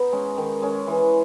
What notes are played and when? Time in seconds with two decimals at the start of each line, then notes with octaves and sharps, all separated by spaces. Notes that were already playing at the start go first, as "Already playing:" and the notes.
Already playing: B3 D#4
0.12 G#3 C#4
0.37 D#3
0.62 G#3 C#4
0.87 E3